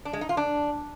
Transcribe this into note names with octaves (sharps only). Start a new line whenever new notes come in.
D4
G#3
D#4
F4
D4